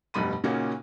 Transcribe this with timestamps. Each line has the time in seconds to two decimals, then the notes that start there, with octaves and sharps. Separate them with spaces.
0.14 F1 G2 B2 G3 B5 D#7
0.44 A#2 C#3 A#3 C#4 D#4 F#4